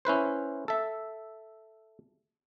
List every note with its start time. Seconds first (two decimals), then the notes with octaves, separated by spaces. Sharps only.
0.05 C#4 E4 B4 C5
0.68 A4 E5